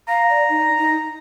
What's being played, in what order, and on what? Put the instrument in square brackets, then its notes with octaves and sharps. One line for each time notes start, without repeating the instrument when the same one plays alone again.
[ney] F5 [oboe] A#5
[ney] D5
D#4
D#4